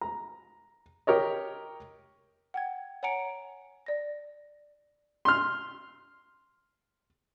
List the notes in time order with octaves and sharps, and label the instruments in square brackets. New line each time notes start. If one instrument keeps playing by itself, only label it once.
[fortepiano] A#5
G4 A#4 C#5 D#5
[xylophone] F#5 G5 G#6
C#5 F#5 G#5 A#5 C#7 D7
D5 A#6
[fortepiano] C6 F6